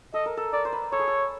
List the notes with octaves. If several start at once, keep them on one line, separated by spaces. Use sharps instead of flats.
A4 D#5
A#4
A4
A#4 D5
C5
B4
A4 C#5
G#4
A4